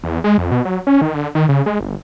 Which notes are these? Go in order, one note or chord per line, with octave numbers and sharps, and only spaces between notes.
E2
G#3
F2
B2
F#3
C#4
D#3
D3
D#3
C#3
G#3
G1